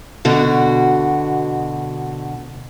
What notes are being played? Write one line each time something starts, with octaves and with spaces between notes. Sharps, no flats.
B2 D3 F#4